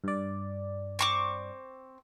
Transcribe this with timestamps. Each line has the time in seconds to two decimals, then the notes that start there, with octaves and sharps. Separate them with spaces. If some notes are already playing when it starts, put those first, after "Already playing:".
0.04 G2 D5
0.99 C4 C#6 D6